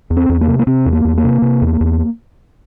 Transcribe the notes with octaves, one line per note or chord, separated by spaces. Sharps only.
E2
C4
E2
A#3
C3
A#3
C3 C4
E2
A#3
E2
A#3
C3
C3
E2
E2